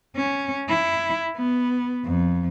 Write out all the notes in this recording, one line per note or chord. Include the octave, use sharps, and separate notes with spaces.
C#4
E4
B3
F2